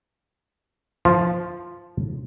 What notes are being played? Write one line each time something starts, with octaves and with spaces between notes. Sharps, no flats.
F3